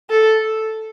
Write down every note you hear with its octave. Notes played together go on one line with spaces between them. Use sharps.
A4